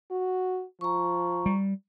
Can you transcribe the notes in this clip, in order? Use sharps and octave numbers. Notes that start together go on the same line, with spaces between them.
F#4
F3 A#5 C#6
G3